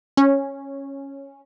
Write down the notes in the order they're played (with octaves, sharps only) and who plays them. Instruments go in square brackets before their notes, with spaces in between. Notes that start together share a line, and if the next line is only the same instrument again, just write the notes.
[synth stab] C#4